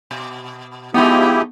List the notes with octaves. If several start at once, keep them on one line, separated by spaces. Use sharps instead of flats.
B2
F3 G#3 A3 B3 D#4 E4 G4